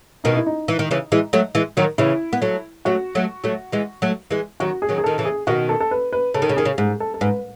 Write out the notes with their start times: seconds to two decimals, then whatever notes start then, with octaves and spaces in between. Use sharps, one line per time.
0.24 B2 D#3 D#4
0.35 E4
0.46 D#4
0.68 E3
0.79 D#3
0.91 C#3 E3
1.12 E3 G#3
1.33 F#3 A3
1.55 E3 G#3
1.77 D#3 F#3
1.98 C#3 E3 E4
2.33 B3
2.42 F#3 A3
2.85 F#3 A3 F#4
3.15 F#3 A3
3.44 F#3 A3
3.72 E3 G#3
4.02 F#3 A3
4.31 E3 G#3
4.60 D#3 F#3 F#4
4.82 G#4
4.89 D#3 F#3
4.98 G#4
5.04 D#3 A4
5.18 C#3 E3
5.25 G#4
5.47 B2 D#3 F#4
5.69 A4
5.80 A4
5.91 B4
6.13 B4
6.34 C#3 A4
6.42 D#3
6.49 C#3
6.57 D#3 G#4
6.65 C#3
6.78 G#2 G#4
7.00 A4
7.14 A4
7.21 G#2 B4